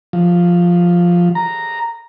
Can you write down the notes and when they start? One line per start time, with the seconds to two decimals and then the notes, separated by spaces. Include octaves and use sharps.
0.13 F3
1.35 A#5